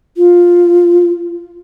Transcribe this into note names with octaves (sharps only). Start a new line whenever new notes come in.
F4